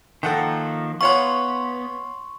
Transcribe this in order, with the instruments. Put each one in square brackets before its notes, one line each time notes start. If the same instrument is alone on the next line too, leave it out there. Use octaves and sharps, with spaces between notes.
[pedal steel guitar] D#3 F3 A#3 [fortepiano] A4 F#5 G5
[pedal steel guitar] B3 [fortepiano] F4 C#5 F#5 [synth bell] C6 C#6